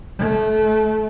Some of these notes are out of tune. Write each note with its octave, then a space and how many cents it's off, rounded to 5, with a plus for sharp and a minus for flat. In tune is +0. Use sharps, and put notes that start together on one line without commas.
A3 -25